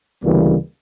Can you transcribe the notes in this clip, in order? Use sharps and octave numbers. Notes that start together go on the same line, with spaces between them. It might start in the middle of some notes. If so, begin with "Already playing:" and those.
D2 C#3 E3 G3 A#3 B3